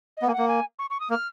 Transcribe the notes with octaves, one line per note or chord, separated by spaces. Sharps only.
D#5
B3
A#3 G#5
F#5
A#3
G#5
C#6
C#6
D#6
A#3 F6